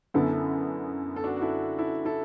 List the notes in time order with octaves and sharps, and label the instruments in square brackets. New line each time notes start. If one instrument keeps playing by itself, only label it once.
[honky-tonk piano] F#2 D3 B3 [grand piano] E4 A4
[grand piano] A4
D4 F#4
F#4
E4 A4
E4 A4
E4 A4